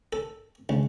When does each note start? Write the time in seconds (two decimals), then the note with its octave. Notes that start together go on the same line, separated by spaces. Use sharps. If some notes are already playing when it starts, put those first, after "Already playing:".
0.13 A4
0.69 C#2